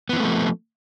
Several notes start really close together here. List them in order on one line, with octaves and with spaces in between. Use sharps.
B3 E3 C4 A3 F3